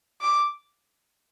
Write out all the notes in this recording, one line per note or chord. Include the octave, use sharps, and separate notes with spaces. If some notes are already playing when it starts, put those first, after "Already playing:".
D6